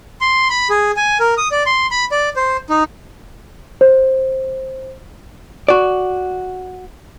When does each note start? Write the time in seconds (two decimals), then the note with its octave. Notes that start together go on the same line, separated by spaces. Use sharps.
0.21 C6
0.50 B5
0.70 G#4
0.97 G#5
1.20 A#4
1.37 D#6
1.51 D5
1.66 C6
1.91 B5
2.11 D5
2.36 C5
2.70 D#4
3.81 C5
5.68 F#4 D5